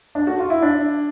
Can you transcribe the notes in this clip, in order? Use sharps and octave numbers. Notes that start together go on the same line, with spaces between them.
D4
F#4
F4
E4
D4